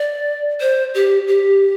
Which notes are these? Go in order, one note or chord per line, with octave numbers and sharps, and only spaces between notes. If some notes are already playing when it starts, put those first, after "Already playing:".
Already playing: D5
C5
G4
G4